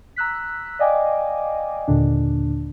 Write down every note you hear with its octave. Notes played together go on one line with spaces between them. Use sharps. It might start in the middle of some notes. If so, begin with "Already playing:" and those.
A#5 E6 F#6 B6
D5 D#5 F5 G5 G#5 D6
D#2 A#2 D3 D4